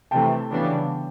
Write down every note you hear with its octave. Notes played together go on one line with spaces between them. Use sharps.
C3 E3 A3 G5 A5
C#3 E3 G3 B3 D4